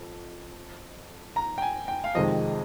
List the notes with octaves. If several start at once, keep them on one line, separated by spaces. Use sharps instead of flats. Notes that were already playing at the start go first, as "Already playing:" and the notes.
Already playing: F2
A#5
G5
G#5
G5
F5
F2 C3 D#3 G#3 C4 D#5